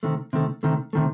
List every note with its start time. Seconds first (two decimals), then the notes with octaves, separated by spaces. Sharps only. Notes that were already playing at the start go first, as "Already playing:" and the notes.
0.03 C3 D#3 A3
0.33 C3 D#3 A3
0.63 C3 D#3 A3
0.93 C3 D#3 A3